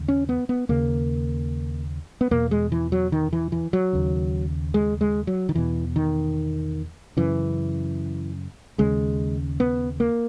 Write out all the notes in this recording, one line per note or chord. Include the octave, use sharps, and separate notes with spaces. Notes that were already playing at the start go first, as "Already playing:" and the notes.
Already playing: D#2 C#3
C#4
B3
B3
D#2 C#3 A#3
B3
E2 B2 A#3
G#3
E3
F#3
D#3
E3
E3
F#3
D#2 C#3
G#3
G#3
F#3
D#3
E2 B2 E3
D#3
F#2 C#3 E3
D#2 C#3 G#3
B3
A#3